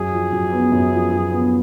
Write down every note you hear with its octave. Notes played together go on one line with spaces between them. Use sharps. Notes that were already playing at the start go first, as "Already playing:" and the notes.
Already playing: F#2 G#4
F3
F#2
B3
F#2
F3
F#2
B3